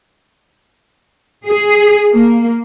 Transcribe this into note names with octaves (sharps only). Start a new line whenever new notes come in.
G#4
A#3